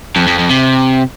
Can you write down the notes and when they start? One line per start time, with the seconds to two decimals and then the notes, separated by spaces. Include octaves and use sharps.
0.16 F2
0.27 F2
0.38 F2
0.49 C3